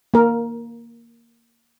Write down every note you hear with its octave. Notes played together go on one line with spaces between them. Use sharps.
A#3 A#4